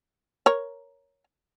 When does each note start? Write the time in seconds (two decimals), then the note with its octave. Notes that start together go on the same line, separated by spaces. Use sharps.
0.46 A#4 C#5